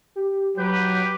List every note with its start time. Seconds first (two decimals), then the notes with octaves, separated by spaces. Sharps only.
0.16 G4
0.57 F#3 G4 B4 G6